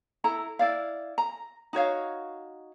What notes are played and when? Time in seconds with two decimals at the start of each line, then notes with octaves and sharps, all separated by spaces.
0.24 E4 A4 A#5
0.59 E4 D5 F5
1.18 A#5
1.73 D#4 F#4 C#5 F5